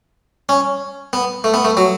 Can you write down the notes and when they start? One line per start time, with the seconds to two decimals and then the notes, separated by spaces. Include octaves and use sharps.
0.49 C#4
1.13 B3
1.44 A3
1.54 B3
1.65 A3
1.77 F#3